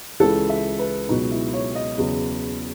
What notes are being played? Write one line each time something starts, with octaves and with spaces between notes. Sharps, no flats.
C#2 C#3 E3 A4
E5
B4
C#2 B2 F#3 D#4
E4
C#5
D#5
E2 C#3 F#3